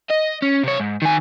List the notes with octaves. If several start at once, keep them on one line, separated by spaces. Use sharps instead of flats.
D#5
C#4
C3 C#5
G#2
D#3 G#5